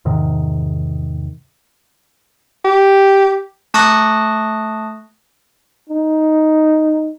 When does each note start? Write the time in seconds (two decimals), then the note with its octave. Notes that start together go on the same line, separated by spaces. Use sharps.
0.05 E2 G#2 C3 D#3
2.65 G4
3.74 A3 A5 C#6 D#6 F#6 A#6
5.90 D#4